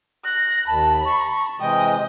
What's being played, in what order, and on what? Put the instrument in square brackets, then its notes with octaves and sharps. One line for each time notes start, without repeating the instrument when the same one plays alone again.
[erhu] F#6 [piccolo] A#6
[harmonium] D#2 [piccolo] A5 [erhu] B5
[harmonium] A5 [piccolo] C#6
[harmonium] C3 E3 G#3 [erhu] D#5 [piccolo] G5